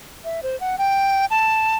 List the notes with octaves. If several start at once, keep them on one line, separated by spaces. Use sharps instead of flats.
E5
C5
F#5
G5
A5